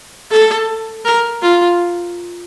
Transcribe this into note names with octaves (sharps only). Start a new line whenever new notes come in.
A4
A#4
F4